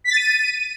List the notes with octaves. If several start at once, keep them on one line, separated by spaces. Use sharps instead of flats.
B6
A6
D#7